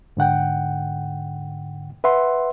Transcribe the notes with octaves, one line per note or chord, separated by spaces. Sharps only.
G#2 D3 F#5 G5
B4 E5 F#5 C6